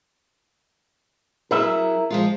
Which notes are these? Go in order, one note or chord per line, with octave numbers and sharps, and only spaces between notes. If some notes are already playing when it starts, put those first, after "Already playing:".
F#3 E4 G#4 A#4 E5
F3 G#3 F4